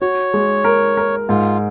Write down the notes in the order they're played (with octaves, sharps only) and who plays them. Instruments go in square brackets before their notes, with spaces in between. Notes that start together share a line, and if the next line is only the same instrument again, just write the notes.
[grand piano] F#4 [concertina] C#5
[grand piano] G#3
A#4
A#4
[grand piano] G#2 [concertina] F4